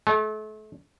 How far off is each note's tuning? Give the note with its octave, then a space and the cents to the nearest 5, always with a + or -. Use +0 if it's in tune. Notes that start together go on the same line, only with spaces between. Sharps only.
A3 -35